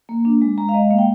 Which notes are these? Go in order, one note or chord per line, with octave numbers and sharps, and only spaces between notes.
A#3
D4
G#3
G#3 A#5
F5
G#3 D#5
A#3 F5
G5